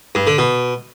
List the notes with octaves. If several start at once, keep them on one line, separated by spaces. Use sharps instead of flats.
G2
D3
B2